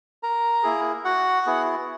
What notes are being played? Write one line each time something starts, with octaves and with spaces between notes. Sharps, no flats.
A#4 A#5
A#3 E4 G#4
F#4 F#5
B3 E4 G#4